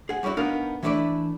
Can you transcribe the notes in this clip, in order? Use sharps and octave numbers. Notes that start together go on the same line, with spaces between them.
G#4 F#5
G3 C#4 D#4 E4 F#4
B3 D4 D#4 A#4 F5
E3 A3 D4 E4 B4 D5